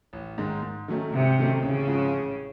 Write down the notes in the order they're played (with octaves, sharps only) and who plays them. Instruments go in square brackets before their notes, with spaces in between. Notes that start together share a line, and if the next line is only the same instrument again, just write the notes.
[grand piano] A1
G#2 D#3 G#3
G#2
D#3 F#3 A3 C#4
[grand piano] G#2 [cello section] C3
[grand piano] D#3 F#3 A3 C#4
[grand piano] A1 [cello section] C#3
[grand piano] G#2 F3
A1